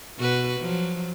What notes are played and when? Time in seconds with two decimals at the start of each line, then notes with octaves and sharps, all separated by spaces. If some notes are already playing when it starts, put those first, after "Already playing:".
0.17 B2 F#4 B4
0.60 F3 F#3